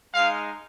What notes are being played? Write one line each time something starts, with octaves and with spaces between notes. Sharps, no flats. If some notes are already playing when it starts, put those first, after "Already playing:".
G#3 D#4 F5